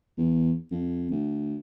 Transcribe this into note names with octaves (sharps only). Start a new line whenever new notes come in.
E2
F2
D2